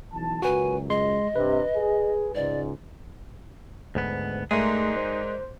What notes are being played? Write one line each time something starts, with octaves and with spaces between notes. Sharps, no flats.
B1 E3 A5
C#2 F#2 F#4 B4 G#5
G#3 D#5 C6
G2 C3 B4
G#4
C#2 G#2 D5
D2 G#2 B3
G#2 A3 D#4 G#4 A#4 D5 D#5
C5